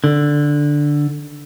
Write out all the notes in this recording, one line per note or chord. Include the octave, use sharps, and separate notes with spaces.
D3